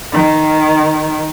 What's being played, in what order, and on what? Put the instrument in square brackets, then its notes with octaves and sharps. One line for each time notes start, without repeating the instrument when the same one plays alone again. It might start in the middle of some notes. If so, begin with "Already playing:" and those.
[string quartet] D#3